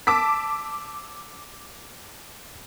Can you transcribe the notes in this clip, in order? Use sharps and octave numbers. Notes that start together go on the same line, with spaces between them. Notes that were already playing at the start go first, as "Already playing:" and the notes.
A5 D6 E6 B6